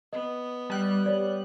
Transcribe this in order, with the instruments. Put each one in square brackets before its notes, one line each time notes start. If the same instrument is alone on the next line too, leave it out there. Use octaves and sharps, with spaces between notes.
[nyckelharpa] B3 [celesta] D#5
[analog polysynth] G3 F#6
[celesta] C#5 D5